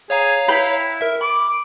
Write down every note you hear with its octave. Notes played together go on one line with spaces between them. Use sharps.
G#4 C#5 F5 A#5
E4 B4 G5 B5
A#4 E5
B5 D6